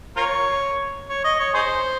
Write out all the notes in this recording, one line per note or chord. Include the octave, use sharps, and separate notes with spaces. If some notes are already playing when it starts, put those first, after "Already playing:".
F4 A#4 C#5
C#5
D#5
C#5
D#4 G#4 C5